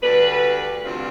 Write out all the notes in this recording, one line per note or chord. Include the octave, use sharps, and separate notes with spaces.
D2 D3 G3 D4 B4
D2 C3 G3 C4 F4